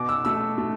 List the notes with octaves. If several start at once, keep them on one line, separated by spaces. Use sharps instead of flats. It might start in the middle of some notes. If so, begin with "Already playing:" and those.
Already playing: B2 D6
E6
A3 E6
A3